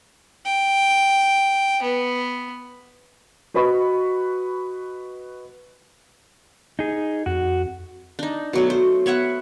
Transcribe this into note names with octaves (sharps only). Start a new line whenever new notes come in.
G5
B3
F#4 B4 D#5 B5 C#6
D#4 G#4
F2 F#4
D4 D#4
B2 F#3 A3
C5
B3 C#5 E5 F#5